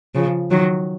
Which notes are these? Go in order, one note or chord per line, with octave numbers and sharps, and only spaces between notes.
C#3 F3
D#3 F#3